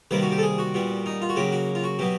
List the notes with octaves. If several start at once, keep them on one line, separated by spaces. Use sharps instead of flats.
C3 D#3 G3 A#3 B4
F#4
G4
A4
G#4
F#4
A#2 G3 B3
D#4
F4
F#4
C#3 F#3 A#3 G4
F#4
F4
F#4
B2 F#3 B3 G4